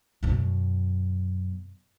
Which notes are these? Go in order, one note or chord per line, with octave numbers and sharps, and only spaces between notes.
F#2 B2